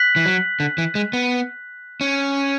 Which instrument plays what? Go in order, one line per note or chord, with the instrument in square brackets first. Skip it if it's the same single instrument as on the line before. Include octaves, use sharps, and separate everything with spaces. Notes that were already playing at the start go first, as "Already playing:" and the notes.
Already playing: [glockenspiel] F#6 B6 F#7
[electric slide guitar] E3
F#3
D3
E3
G#3
B3
C#4